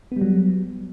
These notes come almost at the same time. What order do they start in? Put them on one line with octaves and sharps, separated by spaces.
B3 G3 F#3